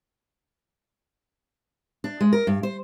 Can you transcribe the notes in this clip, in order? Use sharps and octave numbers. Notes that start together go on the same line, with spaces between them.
D4
G#3
A#4
G2
C5